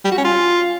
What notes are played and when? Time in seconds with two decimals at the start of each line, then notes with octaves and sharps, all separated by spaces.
0.05 G3
0.11 F#4
0.18 C#4
0.25 F4